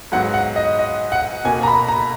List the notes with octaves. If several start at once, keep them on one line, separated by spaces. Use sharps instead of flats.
G#2 F#3 B3 F#5
F#5
D#5
D#5
F#5
B2 A#3 G#5
A#5
B5
A#5